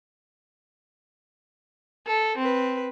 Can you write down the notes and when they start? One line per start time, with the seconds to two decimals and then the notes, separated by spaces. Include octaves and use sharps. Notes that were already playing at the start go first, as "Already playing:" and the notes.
2.07 A4
2.38 C4 B4